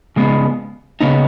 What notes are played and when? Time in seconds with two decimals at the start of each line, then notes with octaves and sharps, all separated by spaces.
0.16 C#3 G#3 B3
1.01 C#3 B3 D#4